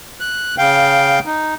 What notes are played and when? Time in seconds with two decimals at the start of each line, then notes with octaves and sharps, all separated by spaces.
0.20 F#6
0.58 C#3 F5 G5
1.26 D#4